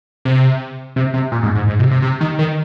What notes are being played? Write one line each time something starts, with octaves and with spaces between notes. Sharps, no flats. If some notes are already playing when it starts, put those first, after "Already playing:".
C3
C3
C3
A#2
G#2
G#2
G#2
C3
C3
C3
D#3
D#3